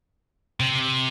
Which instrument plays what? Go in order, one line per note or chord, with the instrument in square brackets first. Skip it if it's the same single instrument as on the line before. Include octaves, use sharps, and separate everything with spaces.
[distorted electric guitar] C3